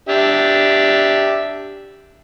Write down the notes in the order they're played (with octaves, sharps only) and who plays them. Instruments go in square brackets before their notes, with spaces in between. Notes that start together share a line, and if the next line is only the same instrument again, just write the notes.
[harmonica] D4 G4 E5